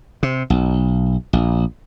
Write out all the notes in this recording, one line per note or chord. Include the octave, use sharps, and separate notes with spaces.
C3
B1
A#1